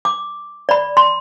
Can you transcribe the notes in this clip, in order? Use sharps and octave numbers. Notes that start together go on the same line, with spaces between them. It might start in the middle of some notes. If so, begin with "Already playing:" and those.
D6
D5 B5
C6